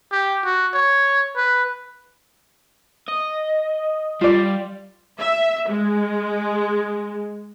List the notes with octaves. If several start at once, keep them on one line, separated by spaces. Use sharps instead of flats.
G4
F#4
C#5
B4
D#5
G3 F4 D5
E5
G#3